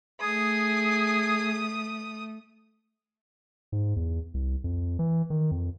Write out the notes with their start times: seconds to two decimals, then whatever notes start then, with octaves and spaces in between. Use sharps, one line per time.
0.21 A3 G#4 D#6
3.72 G#2
3.96 E2
4.34 C2
4.64 F2
4.99 E3
5.30 D#3
5.51 F2